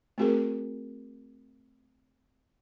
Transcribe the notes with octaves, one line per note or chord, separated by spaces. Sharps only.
A3 C4 F#4 G#4 A#4